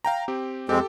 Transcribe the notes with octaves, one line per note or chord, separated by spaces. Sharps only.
F5 G5 A#5
C4 G4
F2 G#3 C4 G4 A4 G5